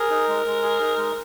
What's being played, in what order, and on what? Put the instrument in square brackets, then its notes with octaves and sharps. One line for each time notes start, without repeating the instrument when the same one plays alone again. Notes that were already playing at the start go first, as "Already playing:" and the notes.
Already playing: [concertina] G#4 [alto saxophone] A#4
[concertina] D#4
G#3
G#3
G#4
D#4
G#3